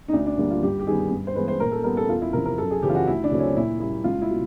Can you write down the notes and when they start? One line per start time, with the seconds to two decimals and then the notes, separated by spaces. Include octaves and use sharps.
0.08 D#4
0.13 D2 D4
0.26 D4
0.37 D3 G3 A#3
0.51 F4
0.63 G2 G4
0.79 G4
0.87 D#3 G3 B3 G#4
1.11 G2
1.27 C5
1.35 E3 G#3 B3 B4
1.48 C5
1.60 A#2 A#4
1.72 A4
1.84 G3 B3 A#4
1.97 A4
2.09 E2 F4
2.22 E4
2.33 C3 F3 A#4
2.46 A#4
2.58 F#2 A4
2.71 G#4
2.82 C#3 E3 G4
2.89 F4
2.95 F#4
3.07 D2 E4
3.24 D4
3.31 C#3 F#3 A3 C4
3.39 C#4
3.56 A#2 E4
3.80 G3 A#3 E4
4.04 C#2 F4
4.22 E4
4.30 B2 F#3